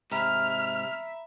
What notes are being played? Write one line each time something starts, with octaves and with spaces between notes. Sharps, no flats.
G#2 C3 E5 A#5 B5 F6